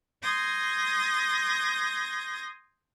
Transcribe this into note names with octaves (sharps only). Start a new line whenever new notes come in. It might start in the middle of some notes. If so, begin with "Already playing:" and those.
C6 D#6 G6 G#6 A#6